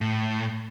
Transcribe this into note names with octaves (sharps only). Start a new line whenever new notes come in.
A2